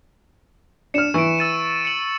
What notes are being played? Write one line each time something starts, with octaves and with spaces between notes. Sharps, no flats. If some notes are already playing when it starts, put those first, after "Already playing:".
D4 F6 C#7 E7
E3 C#6 D7
E6 A6 D#7
C#7 F#7